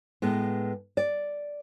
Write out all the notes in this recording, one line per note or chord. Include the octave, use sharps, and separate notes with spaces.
A2 G#3 B3
D5